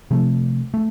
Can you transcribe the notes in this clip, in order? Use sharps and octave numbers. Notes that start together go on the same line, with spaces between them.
C3 F3 A3
A3